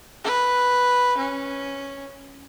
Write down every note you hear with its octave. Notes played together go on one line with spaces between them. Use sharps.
B4
C#4